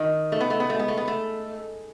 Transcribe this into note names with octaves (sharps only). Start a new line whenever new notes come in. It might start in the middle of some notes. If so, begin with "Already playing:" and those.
Already playing: D#3 D#4
A3 D#4
B3
A3
B3
A3
G#3 B3
A3
B3
A3